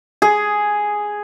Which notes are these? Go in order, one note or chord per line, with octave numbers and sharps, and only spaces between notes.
G#4